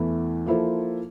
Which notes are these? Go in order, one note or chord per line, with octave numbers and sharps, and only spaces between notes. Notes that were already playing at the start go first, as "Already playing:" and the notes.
Already playing: E2 E3 A3 E4
F3 A#3 E4 A4 C5